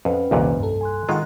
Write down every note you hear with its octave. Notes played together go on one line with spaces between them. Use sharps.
F2 C#4 B4 F#5
C2 F2 A#2 D#3
G2 A4
G#5 C6 F#6
D#3 G#3 F4 D#5 F#5